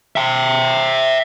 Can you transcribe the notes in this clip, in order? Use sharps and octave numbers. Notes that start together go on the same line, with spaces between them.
E5 G5